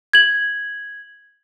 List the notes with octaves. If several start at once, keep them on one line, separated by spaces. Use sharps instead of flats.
G#6 F#7